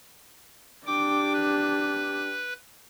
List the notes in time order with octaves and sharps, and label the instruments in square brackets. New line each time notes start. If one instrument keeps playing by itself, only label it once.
[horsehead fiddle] D4 G4 [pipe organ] G5 D6
[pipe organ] B4